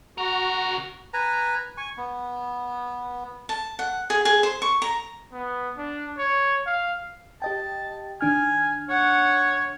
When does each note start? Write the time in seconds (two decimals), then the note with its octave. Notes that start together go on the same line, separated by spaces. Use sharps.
0.18 C#3 F#4 A#4
1.14 B4 G#5 A#5
1.77 G#5 C#6
1.97 B3
3.49 A5
3.79 F#5
4.10 G#4
4.25 G#4
4.43 C5
4.62 C#6
4.82 A#5
5.33 B3
5.78 D4
6.18 C#5
6.67 F5
7.42 G4 D#5 G5 A5
8.21 D#3 D4 G#5 F6
8.89 C#5 F#5